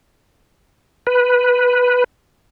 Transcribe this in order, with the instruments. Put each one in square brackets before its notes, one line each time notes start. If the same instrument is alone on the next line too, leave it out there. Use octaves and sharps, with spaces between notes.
[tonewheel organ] B4